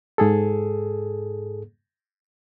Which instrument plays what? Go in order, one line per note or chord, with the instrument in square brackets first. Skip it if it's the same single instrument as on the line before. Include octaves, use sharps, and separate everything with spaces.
[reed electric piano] G#2 G#4 A4